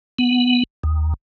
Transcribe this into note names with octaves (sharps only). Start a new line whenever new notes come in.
B3
D#2